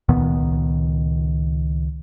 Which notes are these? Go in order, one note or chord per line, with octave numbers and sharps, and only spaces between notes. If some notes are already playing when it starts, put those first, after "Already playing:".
C#2 A#2 D#3 B3